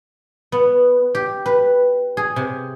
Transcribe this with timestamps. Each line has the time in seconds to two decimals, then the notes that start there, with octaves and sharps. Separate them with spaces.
0.52 B3
1.15 G4
1.46 B4
2.17 G#4
2.36 C3